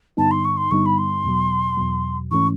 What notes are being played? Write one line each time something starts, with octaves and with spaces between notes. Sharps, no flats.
G2 D3 G3 B3 D#4 A5
C6
C#6
C6
G2 D3 G3 B3 D#4 C#6
B5
C6
E2 B2 F#3
E2 B2 F#3
G#2 E3 A3 C#4 C#6